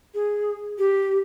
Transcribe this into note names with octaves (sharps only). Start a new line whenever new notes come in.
G#4
G4